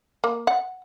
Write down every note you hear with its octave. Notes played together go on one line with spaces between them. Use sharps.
A#3
F#5